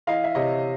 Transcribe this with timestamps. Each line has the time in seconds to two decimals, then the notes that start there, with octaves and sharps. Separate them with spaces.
0.07 E3 D#5 F5
0.24 E5
0.35 C3 C#5 D#5